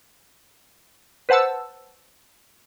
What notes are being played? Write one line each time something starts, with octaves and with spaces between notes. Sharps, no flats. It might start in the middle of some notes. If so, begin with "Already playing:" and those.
B4 C5 F#5 A5 E6